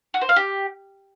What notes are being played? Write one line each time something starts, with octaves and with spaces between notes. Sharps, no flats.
F#4
C5
F5
G4